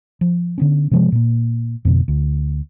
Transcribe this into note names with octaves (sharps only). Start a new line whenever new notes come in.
F3
D3 B3 C#4
C3 F3 G#3
A#2 A#3
F2 B2 D3
D2